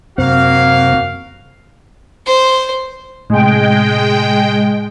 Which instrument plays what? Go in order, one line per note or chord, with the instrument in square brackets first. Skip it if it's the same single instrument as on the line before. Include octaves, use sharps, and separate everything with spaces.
[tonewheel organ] F#2 C3 C4 [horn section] A#3 F#4 F5
[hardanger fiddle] C5
[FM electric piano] A2 C3 [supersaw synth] G#3 G5